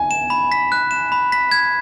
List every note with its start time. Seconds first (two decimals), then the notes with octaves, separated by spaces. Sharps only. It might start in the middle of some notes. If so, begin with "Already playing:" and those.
Already playing: G#5
0.11 E7
0.30 B5
0.52 B6
0.72 F#6
0.91 E7
1.12 B5
1.32 B6
1.51 G#6